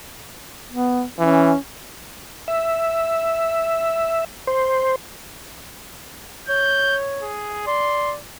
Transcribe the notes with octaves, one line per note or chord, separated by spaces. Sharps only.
B3
E3 C#4
E5
C5
C#5 G6
G#4
D5 C6